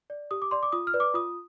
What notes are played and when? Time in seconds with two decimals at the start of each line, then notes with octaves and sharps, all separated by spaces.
0.10 D5
0.31 G4 D#6
0.42 D6
0.51 D5 C6
0.63 D6
0.72 F4 D#6
0.87 F6
0.94 B4 D5
1.00 D6
1.14 F4 D#6